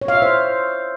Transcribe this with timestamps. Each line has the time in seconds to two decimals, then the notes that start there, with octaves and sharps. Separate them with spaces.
0.02 C#5
0.08 F5
0.15 E5
0.22 C5